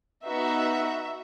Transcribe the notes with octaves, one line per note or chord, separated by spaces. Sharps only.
B3 D#4 F#4 E5